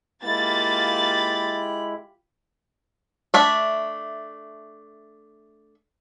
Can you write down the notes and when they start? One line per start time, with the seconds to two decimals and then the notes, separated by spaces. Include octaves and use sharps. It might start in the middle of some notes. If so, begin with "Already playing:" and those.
0.24 G#3 A#3 E4 F4 G4 B5 A6
3.34 A3 D4 E5